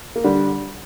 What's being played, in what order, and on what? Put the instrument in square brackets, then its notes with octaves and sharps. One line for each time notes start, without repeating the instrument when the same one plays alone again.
[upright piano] A#3
D3 G3